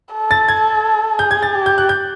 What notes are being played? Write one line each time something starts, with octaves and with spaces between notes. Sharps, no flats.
A4
A6
G#6
G#4 G6
G#6
A6
G4
G6
F#6
G6